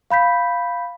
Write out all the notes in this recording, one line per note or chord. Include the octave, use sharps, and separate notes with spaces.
F5 B5 G6 B6